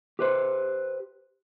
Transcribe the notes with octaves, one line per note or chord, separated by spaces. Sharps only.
G4 B4 C5